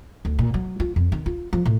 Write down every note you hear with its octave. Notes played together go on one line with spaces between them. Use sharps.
D2
A#2
F#3
F4
F2
D#3
F4
F3
A2